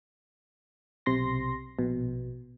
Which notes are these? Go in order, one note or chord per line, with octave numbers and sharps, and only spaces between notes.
B1 C3 C6 A#6
A#1 B2